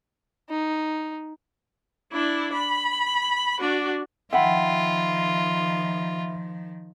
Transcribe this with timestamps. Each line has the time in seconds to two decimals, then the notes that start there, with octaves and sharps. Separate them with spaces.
0.50 D#4
2.12 D4 E4
2.53 B5
3.60 D4 F#4
4.33 D#3 F3 F4 E5 F#5 G5 B5